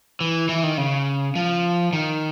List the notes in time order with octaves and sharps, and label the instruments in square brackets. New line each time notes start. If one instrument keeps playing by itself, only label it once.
[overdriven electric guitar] E3
E3
D#3
C#3
F3
D#3